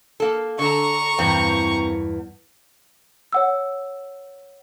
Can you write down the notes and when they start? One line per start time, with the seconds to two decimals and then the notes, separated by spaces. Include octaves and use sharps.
0.20 A#3 A4
0.59 D3 A4 A#5 C#6
1.18 E2 G2 C3 A#3 C4
3.32 C#5 F#5 E6